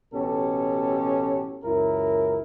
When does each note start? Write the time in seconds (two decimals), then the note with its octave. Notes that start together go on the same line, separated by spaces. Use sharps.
0.14 A1 B2 B3 C#4 G4 A4
1.64 C#2 F#2 E4 A#4